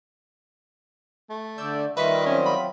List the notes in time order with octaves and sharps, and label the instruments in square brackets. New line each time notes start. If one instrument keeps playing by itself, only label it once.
[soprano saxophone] A3
[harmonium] D3 D5 [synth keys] E6 G6
[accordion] D#3 G3 D#5 [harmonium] F4 [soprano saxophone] B4 [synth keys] E5 C#6 B6
[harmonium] F#3 C4 F4 [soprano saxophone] C#4
[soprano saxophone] B5